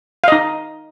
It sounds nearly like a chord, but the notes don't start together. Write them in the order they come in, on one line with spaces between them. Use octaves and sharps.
F5 D#5 D#4